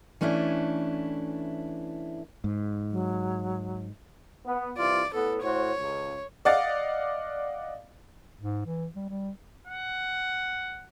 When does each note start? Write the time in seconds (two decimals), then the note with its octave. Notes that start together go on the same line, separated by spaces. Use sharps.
0.21 E3 A3 C#4 D4 E4
2.44 G#2
2.92 F#3
4.45 B3
4.77 C2 E3 F4 D5
5.14 A2 B3 A4
5.43 A2 F#4 C5 C#5
5.79 C#2
6.45 D5 D#5 F5 F#5 D6 A6
8.41 G#2
8.66 E3
8.96 G3
9.09 G3
9.67 F#5